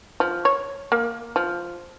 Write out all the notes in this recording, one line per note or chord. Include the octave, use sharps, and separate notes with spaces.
F3
C#5
A#3
F3